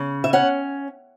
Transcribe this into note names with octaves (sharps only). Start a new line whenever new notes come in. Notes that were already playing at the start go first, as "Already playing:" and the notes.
Already playing: C#3
E5
C#4 F#5